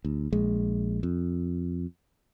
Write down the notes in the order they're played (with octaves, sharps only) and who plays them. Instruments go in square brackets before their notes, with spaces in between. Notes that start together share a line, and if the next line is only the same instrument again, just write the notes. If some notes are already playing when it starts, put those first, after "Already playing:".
[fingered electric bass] D2
A#1 G#3
F2